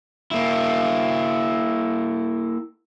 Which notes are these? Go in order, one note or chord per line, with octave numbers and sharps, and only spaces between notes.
A#3 E4